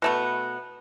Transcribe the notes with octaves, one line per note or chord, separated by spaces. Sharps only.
B2 A3 B3